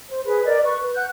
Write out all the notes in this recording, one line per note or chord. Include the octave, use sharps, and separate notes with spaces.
C5
G#4 B4
A#4 D5 D#5
B4 C#6
B4
F#5 F#6 G6